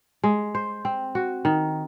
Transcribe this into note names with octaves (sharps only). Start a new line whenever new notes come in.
G#3
C5
C4
F#4
D#3